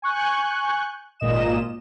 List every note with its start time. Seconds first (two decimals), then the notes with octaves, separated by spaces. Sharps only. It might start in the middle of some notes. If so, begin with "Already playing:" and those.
0.02 G#5 C#6 F#6 G6
1.20 G#1 A#2 D#5 E7